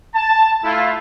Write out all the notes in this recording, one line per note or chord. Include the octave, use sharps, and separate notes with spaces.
A5
A3 E4 F4